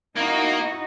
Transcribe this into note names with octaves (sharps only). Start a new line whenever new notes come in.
A#3 D#4 E4 F#4